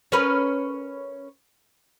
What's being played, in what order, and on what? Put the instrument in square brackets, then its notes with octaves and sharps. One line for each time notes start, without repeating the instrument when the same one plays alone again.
[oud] C#4 A#4 B4